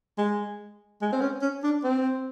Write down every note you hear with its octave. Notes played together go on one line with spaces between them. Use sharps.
G#3
G#3
C4
C#4
C#4
D4
C4